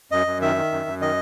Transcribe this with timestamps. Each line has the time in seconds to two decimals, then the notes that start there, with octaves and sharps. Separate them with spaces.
0.11 F#2 D#5
0.27 F#2
0.41 D#3 E5
0.56 D#3
0.72 F#2
0.86 F#2
1.01 D#3 D#5